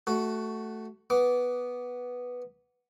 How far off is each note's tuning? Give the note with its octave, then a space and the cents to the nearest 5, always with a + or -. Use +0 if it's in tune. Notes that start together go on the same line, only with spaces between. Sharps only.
A3 +0 F#4 +10
B3 +0 D6 -20